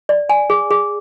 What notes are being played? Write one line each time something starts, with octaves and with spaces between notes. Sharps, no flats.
D5
G#5
G#4
G#4